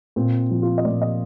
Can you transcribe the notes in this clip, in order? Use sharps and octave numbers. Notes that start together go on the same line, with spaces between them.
A#2 C4
F3
F4
D#5
A#2 D5
D#5